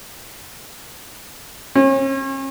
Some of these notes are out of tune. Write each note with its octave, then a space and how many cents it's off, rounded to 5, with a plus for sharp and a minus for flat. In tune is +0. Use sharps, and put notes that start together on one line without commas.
C#4 -40